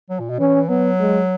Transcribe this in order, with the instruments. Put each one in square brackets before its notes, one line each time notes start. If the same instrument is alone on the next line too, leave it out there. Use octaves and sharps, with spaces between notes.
[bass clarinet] F#3
A#2
B2
[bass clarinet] E3 [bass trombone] C#4
[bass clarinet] F#3 [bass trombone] B3
[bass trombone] G#3